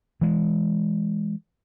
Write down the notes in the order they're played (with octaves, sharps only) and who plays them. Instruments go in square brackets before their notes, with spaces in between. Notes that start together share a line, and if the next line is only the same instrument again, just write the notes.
[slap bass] E3 G#3